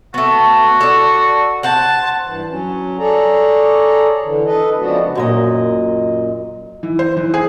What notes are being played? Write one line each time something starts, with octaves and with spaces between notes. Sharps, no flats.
A3 B3 F#4
A4 D5
C5 F#5 A5
G2 E3
F#3 C#4
G#4 A4 C#5 D5 A#5
D3 E3
A4 B4 D#5
C#3 F3 G#3 B3 D4 F#4
F#2 A#2 D#5
E3
C5
E3
G#4